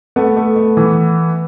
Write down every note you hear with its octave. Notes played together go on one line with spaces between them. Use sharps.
A3 B3
A3
A3
E3